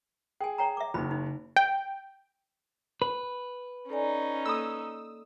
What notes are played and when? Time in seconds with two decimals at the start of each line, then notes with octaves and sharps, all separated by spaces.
0.40 G#4 G5 G#5
0.58 C#5 G5 A#5
0.77 E5 D6
0.94 F#1 D#4 F#4 B5
1.11 D#4
1.56 G5
3.02 B4
3.90 C#4 D#4 A4 D5 G#5
4.46 A#3 A4 B5 D#6 E6